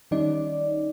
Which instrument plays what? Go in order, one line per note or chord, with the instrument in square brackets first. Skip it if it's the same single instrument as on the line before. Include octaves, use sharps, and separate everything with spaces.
[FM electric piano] D#3 G3 C#4 D#4 D5